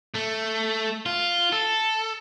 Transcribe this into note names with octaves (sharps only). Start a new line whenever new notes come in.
A3
F4
A4